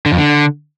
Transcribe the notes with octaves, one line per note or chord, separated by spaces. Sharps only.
D3
F2
D3